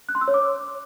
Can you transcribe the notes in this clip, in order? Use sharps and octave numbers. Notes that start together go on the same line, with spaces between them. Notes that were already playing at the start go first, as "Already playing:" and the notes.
F#6
C6
E6
C#5
D6